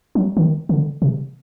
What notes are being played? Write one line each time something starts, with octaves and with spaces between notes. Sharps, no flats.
F#3
D#3
D3
C3